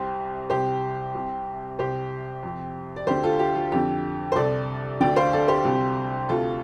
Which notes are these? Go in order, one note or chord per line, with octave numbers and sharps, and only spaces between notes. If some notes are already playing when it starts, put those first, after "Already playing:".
Already playing: C2 C3 G4 C5
C2 C3 G4 C5
C2 C3
C2 C3 G4 C5
F2 C3
D5
D2 D3 G4 C5
F4 A4
G4
F4
F2 D3 G4
C5
C2 C3 A4 D5
D2 D3 D5 G5
C5 F5
A4 D5
G4 C5
C2 C3
D2 C3 F4 A4